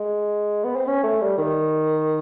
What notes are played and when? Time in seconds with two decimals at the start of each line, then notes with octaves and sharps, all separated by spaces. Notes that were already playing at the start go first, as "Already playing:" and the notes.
Already playing: G#3
0.64 B3
0.76 C4
0.87 C#4
1.03 A3
1.21 G3
1.38 D#3